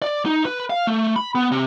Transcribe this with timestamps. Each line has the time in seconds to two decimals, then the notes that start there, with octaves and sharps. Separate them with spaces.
0.02 D5
0.26 D#4
0.45 B4
0.70 F5
0.87 A3
1.16 B5
1.35 B3
1.52 C3